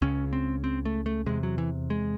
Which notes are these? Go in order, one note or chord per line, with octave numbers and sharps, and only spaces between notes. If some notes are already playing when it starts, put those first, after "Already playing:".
C#2 C#3 C#4
C4
C4
A3
A3
E2 C3 G#3
F#3
E3
G#3